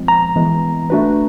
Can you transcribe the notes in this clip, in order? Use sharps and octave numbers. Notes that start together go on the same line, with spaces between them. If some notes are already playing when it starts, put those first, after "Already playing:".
Already playing: F3 G#3 C4
A#5
E3 G#3 B3
A3 D4 F#4 B4